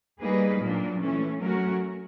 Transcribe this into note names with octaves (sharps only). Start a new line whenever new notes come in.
G3 A#3 D#4 G#4 B4
A#2 F#3 A#3 D4
E3 A3 C#4
F#3 A3 C#4 F#4 A#4